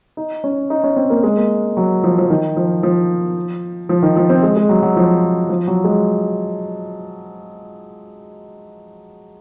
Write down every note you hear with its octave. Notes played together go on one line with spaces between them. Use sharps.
D#4
C#4
D#4
C#4
C4
A#3
G#3
A#3
F#3
F3
F3
D#3
F3
F3
F3
D#3
F3
C4
G#3
G#3
F#3
F#3
F3
F3
F#3
G#3